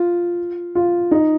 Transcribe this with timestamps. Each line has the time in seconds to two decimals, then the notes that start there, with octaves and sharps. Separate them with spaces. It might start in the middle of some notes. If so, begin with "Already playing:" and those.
Already playing: F4
0.75 F4
1.11 D#4